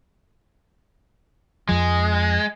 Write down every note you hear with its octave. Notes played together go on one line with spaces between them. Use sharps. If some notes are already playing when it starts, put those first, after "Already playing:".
F2 F3 G#3